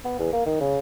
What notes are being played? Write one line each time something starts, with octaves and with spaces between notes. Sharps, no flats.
B3
E2
A#3
D#3
C#3